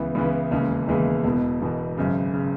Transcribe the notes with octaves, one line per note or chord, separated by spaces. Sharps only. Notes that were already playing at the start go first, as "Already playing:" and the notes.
Already playing: C#2 C#3 E3 B3 E4
C#2 C#3 E3 B3 E4
E1 D#2 C#3 E3 G#3
E1 D#2 C#3 E3 G#3
E1 E2 B2
E1 E2 B2
G#1 F#2 C#3
C#3